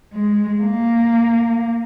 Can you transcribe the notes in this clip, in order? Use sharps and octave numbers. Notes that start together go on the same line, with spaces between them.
G#3
A#3